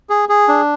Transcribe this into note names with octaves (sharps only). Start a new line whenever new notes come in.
G#4
G#4
D4